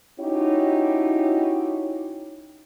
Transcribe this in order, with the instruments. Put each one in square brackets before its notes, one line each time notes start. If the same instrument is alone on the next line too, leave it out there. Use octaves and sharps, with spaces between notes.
[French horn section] C#4 D#4 E4 F#4 G4 C#5